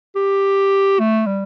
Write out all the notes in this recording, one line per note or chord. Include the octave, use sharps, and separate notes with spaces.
G4
A3
G3